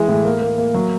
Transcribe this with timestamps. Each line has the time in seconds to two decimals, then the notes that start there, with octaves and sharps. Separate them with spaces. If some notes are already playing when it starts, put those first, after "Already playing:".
Already playing: E3 G#3
0.08 A2
0.25 A#3
0.41 A#3
0.58 A#3
0.74 F#3